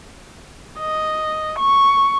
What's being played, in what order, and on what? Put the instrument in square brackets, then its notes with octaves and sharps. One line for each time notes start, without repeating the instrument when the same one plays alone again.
[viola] D#5
C#6